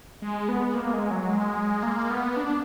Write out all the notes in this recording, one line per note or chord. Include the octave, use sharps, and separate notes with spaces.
G#3
B3
A#3
G#3
F#3
G#3
A#3
B3
D4